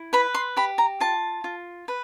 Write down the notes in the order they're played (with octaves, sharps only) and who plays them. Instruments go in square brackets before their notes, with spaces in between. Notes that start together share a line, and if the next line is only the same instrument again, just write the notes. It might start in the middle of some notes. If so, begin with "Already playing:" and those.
Already playing: [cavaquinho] E4
B4 B5
C6
G4 B5
A#5
F4 A5
F4
B4